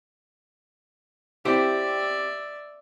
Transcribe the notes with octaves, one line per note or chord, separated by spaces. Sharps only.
C4 E4 G4 D5 E5